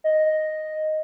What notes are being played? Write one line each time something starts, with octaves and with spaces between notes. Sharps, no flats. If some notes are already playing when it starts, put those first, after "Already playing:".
D#5